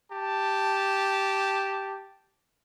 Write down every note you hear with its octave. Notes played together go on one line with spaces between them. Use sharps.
G4 A5